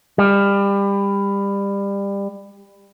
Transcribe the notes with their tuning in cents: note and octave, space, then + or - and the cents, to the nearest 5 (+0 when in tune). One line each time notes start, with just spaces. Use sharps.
G3 +25